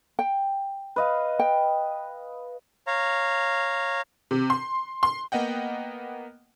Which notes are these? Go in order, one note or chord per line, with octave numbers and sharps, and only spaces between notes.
G5
B4 D#5 F5
G5
C#5 F5 A#5
C3
C6
C6
A#3 B3 D#5 F#5 G5